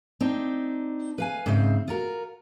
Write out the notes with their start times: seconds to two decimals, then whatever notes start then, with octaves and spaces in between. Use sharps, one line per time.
0.21 C4 D4 D#4
1.18 B4 F5 G#5
1.46 G#2 C#3 C4 C5 E5
1.88 F4 F#4 A#4